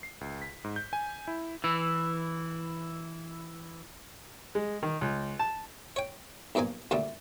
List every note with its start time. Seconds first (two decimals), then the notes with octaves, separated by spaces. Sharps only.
0.03 C7
0.21 C#2
0.42 B6
0.64 G#2
0.76 G6
0.93 G#5
1.28 E4
1.64 E3 E4
4.55 G#3
4.83 D#3
5.01 C#2
5.39 A5
5.96 C#5 G5
6.55 B1 G2 F3 A#3 G#5
6.91 D2 A#2 D3 G3 A3